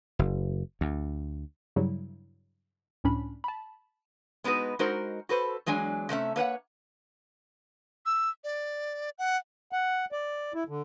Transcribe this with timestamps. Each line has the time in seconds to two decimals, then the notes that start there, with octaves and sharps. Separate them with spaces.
0.19 F#1
0.81 D2
1.76 G2 C#3 F#3 G3 E4
3.04 C#2 A2 C#4 D4 B5
3.44 A5 B5
4.44 G#3 B3 D#4 F#4 B4
4.79 G#3 D#4 F#4 A#4 C5
5.29 F#4 A4 B4 C5
5.66 E2 F#3 G#3 D4 G#5
6.09 C3 A3 C#4 E5
6.36 A#3 B4 C#5 F#5
8.06 E6
8.44 D5
9.18 F#5
9.72 F#5
10.12 D5
10.54 E4
10.69 D3